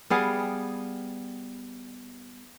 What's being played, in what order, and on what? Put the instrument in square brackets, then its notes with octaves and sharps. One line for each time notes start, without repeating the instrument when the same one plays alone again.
[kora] G3 B3 G#4 F5